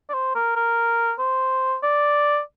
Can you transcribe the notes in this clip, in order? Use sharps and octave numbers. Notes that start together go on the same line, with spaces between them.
D5
C5
A#4
A#4
C5
D5